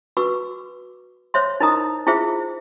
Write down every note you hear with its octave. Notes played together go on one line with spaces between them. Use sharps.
F#4 B4 C#6 D6 E6
C5 C#5 E5 C6
D#4 E4 A#4 D#5 A#5 D#6
E4 F4 G#4 C5 E5